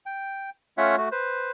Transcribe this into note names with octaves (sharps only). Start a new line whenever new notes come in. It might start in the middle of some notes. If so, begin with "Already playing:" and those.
G5
A3 C#4 F4 C#5 E5 F#5
A3 F#4
B4 C5